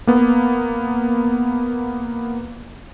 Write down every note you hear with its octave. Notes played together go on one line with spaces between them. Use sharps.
A#3 B3